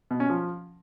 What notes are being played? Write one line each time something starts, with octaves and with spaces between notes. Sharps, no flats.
B2
C#4
F3